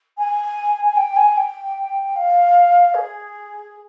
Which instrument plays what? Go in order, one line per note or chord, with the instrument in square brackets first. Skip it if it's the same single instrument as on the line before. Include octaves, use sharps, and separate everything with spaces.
[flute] G#5
G#5
G5
G#5
G5
F5
G#4